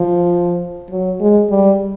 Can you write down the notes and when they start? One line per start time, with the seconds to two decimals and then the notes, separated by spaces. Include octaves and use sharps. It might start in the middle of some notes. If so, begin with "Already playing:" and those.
Already playing: F3
0.90 F#3
1.20 G#3
1.50 G3